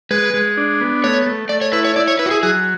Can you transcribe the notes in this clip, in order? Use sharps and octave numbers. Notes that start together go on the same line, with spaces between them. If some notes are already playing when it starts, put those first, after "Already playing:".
G#3 B4
G#3
D4
B3
A3 C#5
A3
A3 D5
C#5
E4 B4
C#5
E4 D5
C#5
E4 B4
F#4
G#4
F#3 G#4